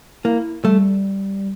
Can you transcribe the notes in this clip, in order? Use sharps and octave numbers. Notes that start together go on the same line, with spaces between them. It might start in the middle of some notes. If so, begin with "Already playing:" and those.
A#3 E4
G3 A3